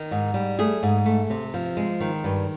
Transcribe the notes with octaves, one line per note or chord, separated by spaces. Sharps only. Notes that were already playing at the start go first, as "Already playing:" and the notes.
Already playing: D#3
G#2
G3
A3 G#4
G#2
A3
C3
F3
G#3
D#3
G2